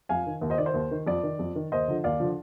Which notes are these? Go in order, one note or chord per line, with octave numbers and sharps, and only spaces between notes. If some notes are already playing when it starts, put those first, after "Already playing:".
F2 F5 G#5
D#3
D#2
C5 D#5
D#3 D5
C5
D#2
D#3
F2 D5
D#3
F2
D#3
D#2 C5 D#5
D3 F3
D#2 D5 F5
D3 F3